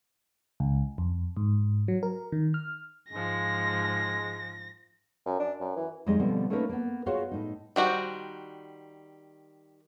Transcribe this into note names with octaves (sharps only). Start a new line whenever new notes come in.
C#2
F2
G#2
F#3
A#4
D#3
F6
G#2 F3 G#3 A#6
F#2
D4
F#2
E3
F2 G3 G#3 D#4 G#4 D#5
B2 D3 F3 G3 B3 C4
A3 A#3 C#4 D#4 A#4 B4
A#3 B3
F4 F#4 G#4 C#5 D#5 F5
A2 D#4
D#3 G3 F#4 C5